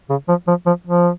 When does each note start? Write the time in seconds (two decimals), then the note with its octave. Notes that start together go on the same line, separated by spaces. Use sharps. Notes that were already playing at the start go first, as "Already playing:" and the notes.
0.09 C#3
0.28 F3
0.48 F3
0.66 F3
0.86 F3